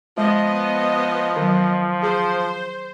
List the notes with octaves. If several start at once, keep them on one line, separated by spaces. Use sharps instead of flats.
F3 G#3 B3 D#5
D#3 F#3
G#4 C5 A5